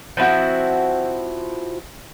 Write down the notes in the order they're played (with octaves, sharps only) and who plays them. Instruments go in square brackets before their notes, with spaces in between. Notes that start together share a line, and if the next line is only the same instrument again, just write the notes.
[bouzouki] F3 C4 E4 F#4